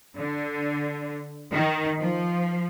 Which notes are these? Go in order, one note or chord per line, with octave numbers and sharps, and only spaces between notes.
D3
D#3
F3